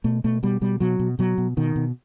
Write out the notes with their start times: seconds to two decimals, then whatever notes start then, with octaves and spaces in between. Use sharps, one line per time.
0.04 B2 A3
0.24 B2 A3
0.43 B2 G3
0.61 B2 G3
0.80 B2 F#3
1.00 B2
1.19 B2 F#3
1.38 B2
1.57 B2 D#3
1.76 B2